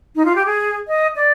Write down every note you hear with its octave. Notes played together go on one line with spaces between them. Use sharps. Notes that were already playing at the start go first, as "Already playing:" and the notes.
D#4
F4
G4
G#4
D#5
D5